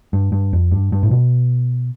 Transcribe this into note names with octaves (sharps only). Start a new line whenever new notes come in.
G2
G2
F2
G2
G2
A2
B2